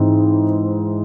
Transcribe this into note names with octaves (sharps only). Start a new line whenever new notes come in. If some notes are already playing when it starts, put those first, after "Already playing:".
Already playing: G#2 E3 C4